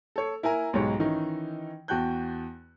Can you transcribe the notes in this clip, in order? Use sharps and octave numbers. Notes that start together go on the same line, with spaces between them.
A4 C#5
E4 A#4 G#5 A#5
B1 G#2 G#3 G4 C#5
D#3 E3 C#4 D#4
E2 F#4 G5 A5 F#6 G6